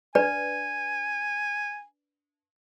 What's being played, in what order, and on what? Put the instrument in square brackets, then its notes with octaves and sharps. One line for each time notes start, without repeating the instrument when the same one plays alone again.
[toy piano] D4 B4 D5 [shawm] G#5